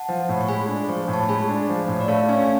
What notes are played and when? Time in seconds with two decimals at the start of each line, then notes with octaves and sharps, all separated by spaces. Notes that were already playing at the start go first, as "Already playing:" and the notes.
Already playing: F#5 A5
0.08 F3
0.29 A2
0.41 C#6
0.48 G#3 G#5 B5
0.68 D4
0.88 F3 C#6
1.08 A2
1.14 A5 C#6
1.24 C#6
1.28 G#3 G#5 B5
1.49 D4
1.69 F3
1.88 A2
2.01 D5
2.08 A3 C#5 F5
2.29 C#4 F5 G#5
2.44 G#5